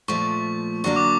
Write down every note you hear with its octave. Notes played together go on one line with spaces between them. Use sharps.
A#2 F3 A3 C#6
D3 F#3 A#3 D4 C#6
D6